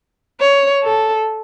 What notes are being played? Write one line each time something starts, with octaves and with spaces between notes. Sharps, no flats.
C#5
A4